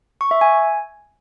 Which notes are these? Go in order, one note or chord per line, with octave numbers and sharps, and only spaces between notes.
C#6
E5
G#5